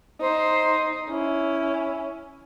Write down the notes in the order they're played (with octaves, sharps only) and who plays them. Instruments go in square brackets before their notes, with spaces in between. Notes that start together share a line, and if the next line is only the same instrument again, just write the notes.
[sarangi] D#4 [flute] C5
[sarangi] C#4 [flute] E4